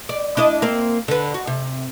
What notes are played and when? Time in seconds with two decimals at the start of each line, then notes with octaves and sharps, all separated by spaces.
0.09 D5
0.37 D4 E4 D#5
0.62 A#3 C4
1.08 D3 B4
1.34 F#4
1.47 C3